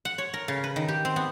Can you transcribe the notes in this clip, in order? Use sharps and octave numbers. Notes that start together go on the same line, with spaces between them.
F#5
C#5
A#4
C#3
B4
D#3
G4
C4
B3